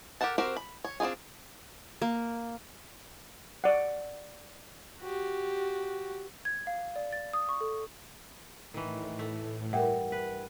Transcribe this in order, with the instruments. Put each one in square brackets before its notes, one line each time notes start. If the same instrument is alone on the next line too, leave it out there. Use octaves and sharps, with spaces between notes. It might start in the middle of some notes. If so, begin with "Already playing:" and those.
[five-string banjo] G4 A4 A#4 F#5 A5
C4 F#4 G4 A#4 C5
B5
C#5
C4 D4 D#4 F4 G#4
[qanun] A#3
[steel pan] D5 F#5
[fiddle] F#4 G4
[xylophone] G#6
F5
D5
A6
D#6
C#6
A4
[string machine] A2 [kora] D#3 E3
[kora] A3
[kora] G2 [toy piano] A#4 E5 [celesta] F#5 G5
[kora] B4